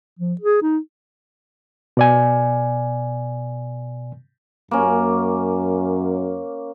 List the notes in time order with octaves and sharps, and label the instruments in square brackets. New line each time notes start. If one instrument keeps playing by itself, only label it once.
[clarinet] F3
G#4
D#4
[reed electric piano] B2 D5 G#5
[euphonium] F#2 [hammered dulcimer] A#3 C#4